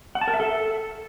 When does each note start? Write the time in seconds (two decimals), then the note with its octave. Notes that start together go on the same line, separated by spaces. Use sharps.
0.15 F#5
0.21 A5
0.28 A#4
0.34 E5
0.40 A4